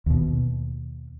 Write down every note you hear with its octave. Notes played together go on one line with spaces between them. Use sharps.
D#2 B2